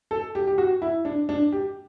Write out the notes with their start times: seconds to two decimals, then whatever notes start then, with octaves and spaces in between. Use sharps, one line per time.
0.11 A4
0.35 G4
0.47 G4
0.58 F#4
0.82 E4
1.05 D4
1.29 D4
1.52 G4